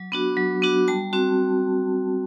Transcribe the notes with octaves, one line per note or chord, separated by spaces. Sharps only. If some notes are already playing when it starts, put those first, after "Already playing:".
Already playing: F#3
B3 D4 F#4
F#3
B3 D4 F#4
G3 A5
C4 F#4